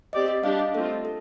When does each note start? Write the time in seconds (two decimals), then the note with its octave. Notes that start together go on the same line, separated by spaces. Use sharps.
0.13 C4 G4 D5 D#5
0.28 D#5
0.43 G3 D4 G4 F5
0.59 D#5
0.74 A3 C4 F4 A4
1.05 A4